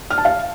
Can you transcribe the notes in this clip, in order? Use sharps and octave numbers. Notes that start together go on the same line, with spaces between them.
F6
A5
F5